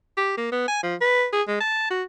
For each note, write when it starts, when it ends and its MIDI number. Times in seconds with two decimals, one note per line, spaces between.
0.17 0.34 67
0.37 0.51 58
0.52 0.64 59
0.68 0.81 80
0.83 0.95 53
1.01 1.27 71
1.33 1.42 68
1.48 1.56 56
1.60 1.88 81
1.90 2.03 66